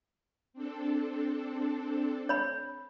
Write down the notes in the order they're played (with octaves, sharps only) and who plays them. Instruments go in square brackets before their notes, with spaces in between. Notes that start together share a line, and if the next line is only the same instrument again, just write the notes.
[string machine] C4 D4 A4
[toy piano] C#5 B5